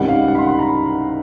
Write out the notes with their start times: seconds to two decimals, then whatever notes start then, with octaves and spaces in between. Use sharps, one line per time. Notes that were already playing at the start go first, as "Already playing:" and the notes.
Already playing: C#2 C3 D#3 G3 F#5
0.09 F5
0.28 F#5
0.35 B5
0.38 C6
0.49 B5
0.59 A#5